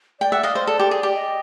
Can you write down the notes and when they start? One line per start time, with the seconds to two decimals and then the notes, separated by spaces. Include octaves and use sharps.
0.20 D5 G5
0.32 E5 F#5
0.43 D#5 F5
0.55 C5
0.67 A4 D5
0.80 G4
0.91 G#4
1.03 G4
1.15 D#5